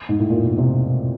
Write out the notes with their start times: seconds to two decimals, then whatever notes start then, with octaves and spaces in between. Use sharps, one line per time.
0.09 G#2
0.19 A2
0.30 A#2
0.43 B2
0.58 C3